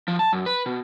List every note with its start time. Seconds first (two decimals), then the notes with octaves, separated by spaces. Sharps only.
0.08 F3
0.19 A5
0.33 F#2
0.46 B4
0.66 B2